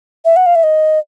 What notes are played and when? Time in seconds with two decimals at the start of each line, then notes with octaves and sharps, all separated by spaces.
0.25 E5
0.36 F#5
0.46 F5
0.55 E5
0.63 D#5